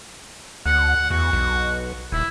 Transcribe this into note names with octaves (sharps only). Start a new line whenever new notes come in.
D2 F#5
E2 F#4
B1
D#1 E4